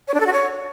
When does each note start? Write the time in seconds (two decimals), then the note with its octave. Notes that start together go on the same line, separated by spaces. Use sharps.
0.08 C#5
0.14 D4
0.20 A4
0.26 F#4
0.33 C#5